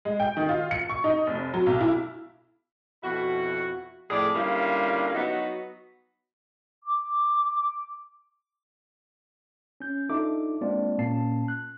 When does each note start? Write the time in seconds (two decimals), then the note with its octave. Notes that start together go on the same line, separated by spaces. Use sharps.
0.05 G#3
0.20 G5
0.37 D#3
0.49 F4
0.71 C#7
0.89 C#6
1.04 D#4
1.27 F1
1.54 F#3
1.66 B1
1.81 E4
3.03 F2 B2 E4 F#4
4.10 F2 A2 G#4 D5
4.34 D3 G3 A#3 C#4 E4 F4
5.14 F#3 B3 D#4 F#4
6.83 D6
9.80 C#4 G6
10.10 D4 D#4 F4 A4 E5 D6
10.61 G#3 A#3 C4 D4 F4 D5
10.98 A#2 A#3 C#4 A5 C7
11.48 F#6